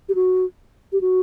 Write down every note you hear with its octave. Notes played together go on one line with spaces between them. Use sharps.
G4
F#4
G4
F#4